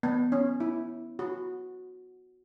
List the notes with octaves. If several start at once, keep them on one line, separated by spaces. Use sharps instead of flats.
B3
C#4
E4
F#4